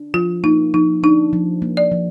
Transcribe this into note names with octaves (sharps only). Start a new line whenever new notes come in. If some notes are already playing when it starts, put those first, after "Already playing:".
Already playing: D4
F3 F4
A#3 D#4
F3 D#4
D4 D#4
F3
A#3
D5
F3